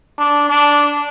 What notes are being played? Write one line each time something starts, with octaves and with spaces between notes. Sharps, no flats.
D4
D4